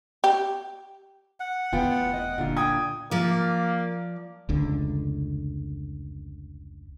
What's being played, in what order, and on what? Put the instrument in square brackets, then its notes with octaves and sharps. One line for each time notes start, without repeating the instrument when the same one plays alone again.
[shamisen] G4
[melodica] F#5
[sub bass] F1 [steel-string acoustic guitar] E2 B3 F4 [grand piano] G5
[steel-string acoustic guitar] D#5
A#2 D3 F4
[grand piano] G5 D#6 G#6
[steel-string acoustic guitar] F3 D5 [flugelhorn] A#3
[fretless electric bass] F1 C#2 D3